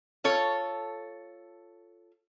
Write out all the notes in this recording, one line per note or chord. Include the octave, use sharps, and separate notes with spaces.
F4 A4 C#5